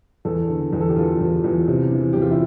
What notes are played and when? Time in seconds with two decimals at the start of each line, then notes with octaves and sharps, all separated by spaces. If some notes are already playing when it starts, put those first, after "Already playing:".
0.25 E2 A4
0.48 D3
0.73 E2
0.81 A4
0.89 G4
0.96 E2 F4
1.20 E2
1.44 E2
1.68 C3
1.92 E3
2.13 E2 G4
2.22 F4
2.31 E4